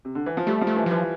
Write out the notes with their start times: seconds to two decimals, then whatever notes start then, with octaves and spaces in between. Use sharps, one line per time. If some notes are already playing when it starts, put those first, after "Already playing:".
0.05 C3
0.15 D3
0.26 E3
0.37 F3
0.47 G3 A3
0.61 F3
0.67 A3
0.76 E3
0.86 E3 F3